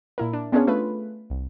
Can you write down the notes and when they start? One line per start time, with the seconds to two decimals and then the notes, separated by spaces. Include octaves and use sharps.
0.18 A#2 E4 A#4
0.33 D4
0.52 B3 C#4 D4 F4 G#4 C#5
0.67 A3 F4 B4
1.30 C2